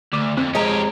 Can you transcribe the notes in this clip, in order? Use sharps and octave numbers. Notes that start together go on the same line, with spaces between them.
D2 D6
F2 C4
F2 G#3 C#4 G4 D#5 A#5